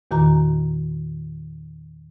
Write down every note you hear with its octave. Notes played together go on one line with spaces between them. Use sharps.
E2 A#2 D#3 F#4 A#5